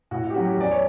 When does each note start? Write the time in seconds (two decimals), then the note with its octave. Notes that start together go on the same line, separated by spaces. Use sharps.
0.11 A2 F#4
0.23 F#4
0.30 G4
0.34 C#4 F#4
0.37 F#3
0.46 G4
0.57 E2 D5
0.71 C#5